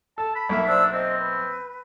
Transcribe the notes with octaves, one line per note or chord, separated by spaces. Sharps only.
A4 A5
B5
B1 A#3 E5
D4 C5 D5 E6
C4 C5 D#5
B4